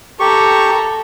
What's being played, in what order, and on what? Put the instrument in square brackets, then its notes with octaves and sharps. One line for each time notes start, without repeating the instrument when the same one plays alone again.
[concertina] G4 C#6 [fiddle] A4 A#5